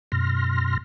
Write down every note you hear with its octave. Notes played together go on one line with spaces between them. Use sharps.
F#2 B2 C6 F6 A#6